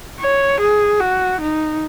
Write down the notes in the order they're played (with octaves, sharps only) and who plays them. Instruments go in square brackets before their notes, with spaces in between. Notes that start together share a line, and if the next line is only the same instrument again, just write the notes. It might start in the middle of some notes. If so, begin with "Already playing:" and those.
[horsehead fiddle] C#5
G#4
F#4
D#4